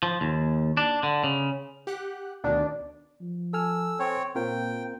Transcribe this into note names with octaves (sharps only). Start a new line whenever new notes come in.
F3
D#2
D4
D3
C#3
G4 F#5 F#6
D2 B2 D#3 D4
F3
A4 G#5 E6 F6
C4 C#5
A#2 C4 F4 A#4 G5